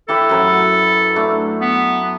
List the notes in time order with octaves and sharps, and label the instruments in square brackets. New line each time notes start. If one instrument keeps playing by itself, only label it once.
[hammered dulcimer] E4 G4 B4 [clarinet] A4
[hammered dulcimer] F#2 F#3 B4
A3 D4
[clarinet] B3